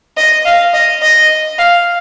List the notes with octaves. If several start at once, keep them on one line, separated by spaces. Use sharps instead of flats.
D#5
F5
D#5
D#5
F5